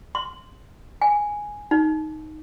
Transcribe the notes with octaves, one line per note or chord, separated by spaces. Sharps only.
C6
G#5
D#4